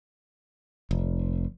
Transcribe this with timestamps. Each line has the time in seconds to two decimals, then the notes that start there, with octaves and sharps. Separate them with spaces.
0.91 F1